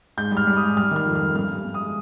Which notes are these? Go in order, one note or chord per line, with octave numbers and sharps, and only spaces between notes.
G#2 G6
G3 F6
G3
D#6
G#2
G3 F6
D#3 F6
F2
F6
G3
G2 F6
G2
G2
D#6
G#3